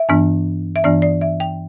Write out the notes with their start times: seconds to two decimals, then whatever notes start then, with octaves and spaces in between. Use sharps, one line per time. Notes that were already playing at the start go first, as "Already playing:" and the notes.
Already playing: E5
0.09 G2 E3 B3 D4
0.76 E5
0.84 G2 E3 B3 D4 D5
1.02 D5
1.21 E5
1.40 G5